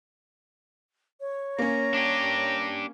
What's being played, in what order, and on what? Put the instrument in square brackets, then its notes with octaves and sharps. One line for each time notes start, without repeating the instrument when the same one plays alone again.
[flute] C#5
[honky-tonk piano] A#3 C#4 [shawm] A#5
[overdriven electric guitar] D4 G4